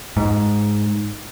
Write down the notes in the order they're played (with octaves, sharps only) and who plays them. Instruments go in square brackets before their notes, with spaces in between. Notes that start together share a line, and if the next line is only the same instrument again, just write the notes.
[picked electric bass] G#2